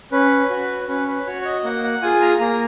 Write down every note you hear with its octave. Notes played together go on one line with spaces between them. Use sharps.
C#4 B4
F#4
C#4 B4
B4
F#4 C#5
C#5
D#5
A#3 F#5
F#5
F4 G#4 G#5
A#5
A#3 A#5